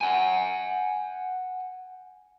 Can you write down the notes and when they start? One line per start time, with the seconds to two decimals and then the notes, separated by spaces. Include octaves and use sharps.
0.01 F#5 G#5